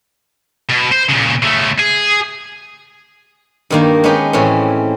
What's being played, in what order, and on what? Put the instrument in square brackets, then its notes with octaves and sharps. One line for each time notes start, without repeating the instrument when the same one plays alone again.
[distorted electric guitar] B2
C5
A#2 C#3
C#3 A3
G#4
[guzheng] G2 D#3 A#3
G#3 B3 C#4 D#4 G4
A2 E3 C4 C#4